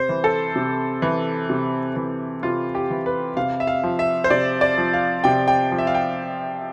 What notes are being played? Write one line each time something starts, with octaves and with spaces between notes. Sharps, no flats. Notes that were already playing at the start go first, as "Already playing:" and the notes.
Already playing: C3 C5
E3
A4
C3
E3
C3
E3
C3 F4
G4
E3
B4
C3 F5
E5
F5
F3
E5
C5
C3 D5
D5
F3
F5
C3 G5
G5
F3
E5
F5
G5